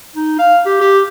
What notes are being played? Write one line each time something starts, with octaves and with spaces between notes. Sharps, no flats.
D#4
F5
G4
G4